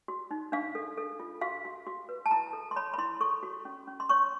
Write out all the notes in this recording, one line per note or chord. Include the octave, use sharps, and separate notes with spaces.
F#4
D#4
D4 F5
A4
A4
F4
F#4 F5
F#4
F#4
B4
A5
E4 A#5
A4
C6
C#5 B5
B5
E4 C6
A4 C#6
F#4
C#4
C#4
C6
C#5 C#6